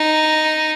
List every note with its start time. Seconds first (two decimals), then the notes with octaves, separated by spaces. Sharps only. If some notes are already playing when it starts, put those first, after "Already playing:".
Already playing: D#4